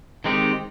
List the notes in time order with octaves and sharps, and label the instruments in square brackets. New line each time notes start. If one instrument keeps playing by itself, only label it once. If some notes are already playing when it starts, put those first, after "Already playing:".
[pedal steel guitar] D#3 G#3 C4 D#4 G4